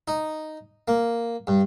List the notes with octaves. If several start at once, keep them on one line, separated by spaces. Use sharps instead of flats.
D#4
A#3
G2